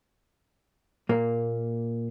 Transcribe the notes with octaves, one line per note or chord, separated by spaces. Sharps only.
A#2 A#3